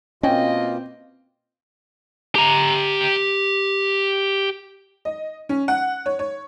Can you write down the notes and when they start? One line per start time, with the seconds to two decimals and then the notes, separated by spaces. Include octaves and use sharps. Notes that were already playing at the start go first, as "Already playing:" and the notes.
0.23 B2 A#3 C4 C#4 F4 D#5 G5
2.35 G4 A#5
5.05 D#5
5.49 C#4
5.68 F#5
6.06 C#5
6.19 C#5